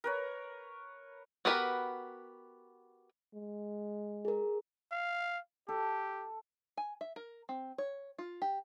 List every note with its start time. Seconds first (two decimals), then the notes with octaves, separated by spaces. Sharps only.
0.04 A#4 B4 C#5
1.45 B3 F#4 G4 A#4 B4
3.34 G#3
4.25 G#4 A#4
4.92 F5
5.69 G4 A4
6.77 G#5
7.01 E5
7.16 A#4
7.49 C4
7.78 C#5
8.18 F4
8.42 G4